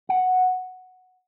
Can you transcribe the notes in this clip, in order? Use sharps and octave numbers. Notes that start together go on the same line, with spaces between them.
F#5